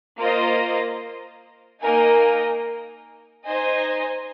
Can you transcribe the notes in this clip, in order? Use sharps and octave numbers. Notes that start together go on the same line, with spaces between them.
A#3 F4 C5 D#5
A#3 D#4 A#4 D#5 G#5
D#4 C5 D#5 G#5